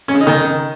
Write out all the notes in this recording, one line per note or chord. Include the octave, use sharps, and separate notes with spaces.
C#4
C#3
D#4
D#3